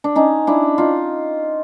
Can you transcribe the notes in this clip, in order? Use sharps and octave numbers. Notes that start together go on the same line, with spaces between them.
D4
C#4 D#4
D4 E4
D#4 F4